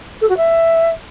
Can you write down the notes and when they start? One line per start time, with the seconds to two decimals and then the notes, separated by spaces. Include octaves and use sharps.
0.21 A4
0.29 F#4
0.37 E5